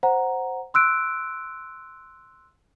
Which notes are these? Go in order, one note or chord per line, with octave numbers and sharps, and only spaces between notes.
C5 F#5 A#5
C6 E6 F#6 D7